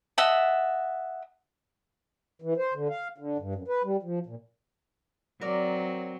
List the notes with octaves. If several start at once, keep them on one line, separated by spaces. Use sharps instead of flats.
D#5 E5 F#5 A5
E3
C5
D3
F5
D3
G2
F#2
B4
G3
F3
A#2
F#3 C4 A#4 D5